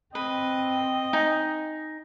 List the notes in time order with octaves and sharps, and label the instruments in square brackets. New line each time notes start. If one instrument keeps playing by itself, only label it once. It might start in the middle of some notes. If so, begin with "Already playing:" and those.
[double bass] C4 [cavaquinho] B4 [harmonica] D#5
[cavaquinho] D#4 G#5